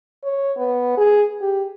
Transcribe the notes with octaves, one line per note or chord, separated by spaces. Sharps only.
C#5
B3
G#4
G4